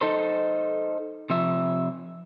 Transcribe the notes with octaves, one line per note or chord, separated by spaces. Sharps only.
D#4 A4 C5
C3 F3 E5